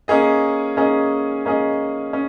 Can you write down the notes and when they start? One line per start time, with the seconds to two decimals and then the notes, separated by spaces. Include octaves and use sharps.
0.08 A#3 C#4 G#4 D#5
0.77 A#3 C#4 G#4 D#5
1.45 A#3 C#4 G#4 D#5
2.13 C#4